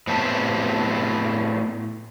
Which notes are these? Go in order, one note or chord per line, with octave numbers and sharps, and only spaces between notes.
A2 B3 C4 E4 G4 A5